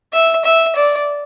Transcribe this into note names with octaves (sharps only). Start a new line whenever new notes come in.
E5
E5
D5